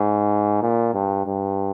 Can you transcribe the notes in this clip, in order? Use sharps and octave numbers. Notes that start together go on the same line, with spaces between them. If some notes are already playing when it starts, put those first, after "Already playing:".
Already playing: G#2
A#2
G2
G2